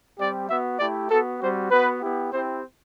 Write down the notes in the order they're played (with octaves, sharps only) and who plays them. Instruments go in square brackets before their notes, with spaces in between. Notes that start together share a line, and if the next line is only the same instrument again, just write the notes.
[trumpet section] G3 C4 G4 D5
B3 F#4 E5
A3 E4 G4 D5
B3 F#4 A4
G3 C4 F#4 C5
B3 F#4 B4
B3 E4 G4
C4 E4 G4 C5